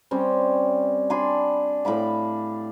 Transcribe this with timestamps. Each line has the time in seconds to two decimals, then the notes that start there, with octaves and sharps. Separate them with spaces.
0.11 G3 C4 C#4
1.10 D4 G#5 B5 C6
1.85 A2 F5 B5 D6